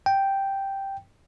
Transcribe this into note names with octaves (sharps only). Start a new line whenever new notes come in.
G5